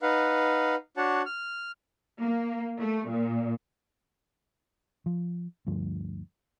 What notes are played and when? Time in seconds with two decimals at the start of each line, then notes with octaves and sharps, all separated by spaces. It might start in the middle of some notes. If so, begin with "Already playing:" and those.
0.02 D#4 B4 F5 F#5
0.97 D4 F#4 C#5 F#5 A5
1.26 F6
2.20 A#3
2.78 A3
3.08 A#2
5.06 F3
5.67 D2 G2 F3